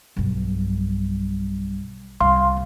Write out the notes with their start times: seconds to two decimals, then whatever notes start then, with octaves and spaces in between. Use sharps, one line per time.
0.17 B1 G2
2.21 C2 F5 C6